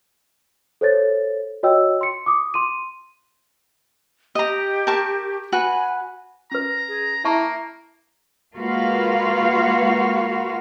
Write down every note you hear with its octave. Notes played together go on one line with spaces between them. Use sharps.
A4 C5 C#5 A6
F#4 C#5 D#5 G5 E6
C6 C#7
D6 D#6
C6 D#7
G4 D#5 A#5
A#4 A5 C#6
F#4 B4 G#5
C#4 B4 A#5
G#4
A#3 E4 E5 A5 A#5 C#6
G#3 A#3 F4 F#4 B4 F5